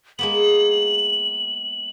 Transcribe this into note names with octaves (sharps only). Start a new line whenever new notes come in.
G#3 A#3 B3 F#7